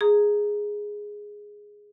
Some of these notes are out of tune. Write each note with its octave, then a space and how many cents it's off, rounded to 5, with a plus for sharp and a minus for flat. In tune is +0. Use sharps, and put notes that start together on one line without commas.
G#4 +0 A#5 -15 D#6 +0